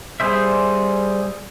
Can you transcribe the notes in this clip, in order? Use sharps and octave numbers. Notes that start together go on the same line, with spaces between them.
G3 G#4 C5 E5